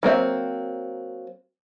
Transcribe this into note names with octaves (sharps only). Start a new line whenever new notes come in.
F#3 A#3 C4 E5